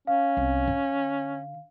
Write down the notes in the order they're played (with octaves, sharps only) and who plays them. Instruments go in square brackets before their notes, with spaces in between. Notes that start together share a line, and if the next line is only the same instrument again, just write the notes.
[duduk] C#4 [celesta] F5
[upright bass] C2
D3